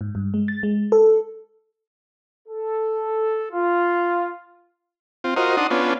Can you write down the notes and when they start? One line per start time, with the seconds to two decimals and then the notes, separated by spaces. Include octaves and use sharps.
0.01 G#2
0.15 G2
0.34 G#3
0.48 A6
0.63 G#3
0.92 A4
2.48 A4
3.51 F4
5.24 C4 F4
5.36 F4 F#4 A#4 C5 D#5
5.57 D4 D#4 F#5 C6 D#6
5.70 B3 C#4 D4 F4